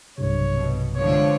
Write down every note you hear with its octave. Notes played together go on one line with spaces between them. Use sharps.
B1 G2 C3 C#5
B2
D3 F3 G#3 C#5